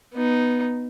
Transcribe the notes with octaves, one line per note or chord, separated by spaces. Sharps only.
B3 D#4